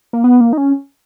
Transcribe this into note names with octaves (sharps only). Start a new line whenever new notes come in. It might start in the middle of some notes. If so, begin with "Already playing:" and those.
A#3
B3
A#3
D#4
C#4